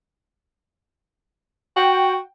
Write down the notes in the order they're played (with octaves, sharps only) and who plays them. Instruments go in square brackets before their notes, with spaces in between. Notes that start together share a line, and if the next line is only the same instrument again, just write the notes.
[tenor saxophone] F#4 [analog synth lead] G5